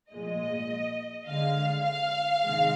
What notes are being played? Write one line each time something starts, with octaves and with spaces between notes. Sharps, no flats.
A#2 F3 G#3 D#5
D3 G#3 F5
F5
C3 D#3 G#3